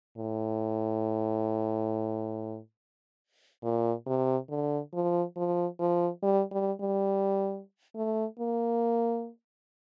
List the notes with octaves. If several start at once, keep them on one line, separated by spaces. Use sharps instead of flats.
A2
A#2
C3
D3
F3
F3
F3
G3
G3
G3
A3
A#3